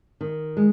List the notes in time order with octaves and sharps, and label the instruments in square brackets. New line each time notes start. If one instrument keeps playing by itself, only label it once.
[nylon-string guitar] D#3
G#3